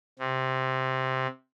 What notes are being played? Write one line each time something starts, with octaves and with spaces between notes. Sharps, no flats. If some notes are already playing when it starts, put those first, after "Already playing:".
C3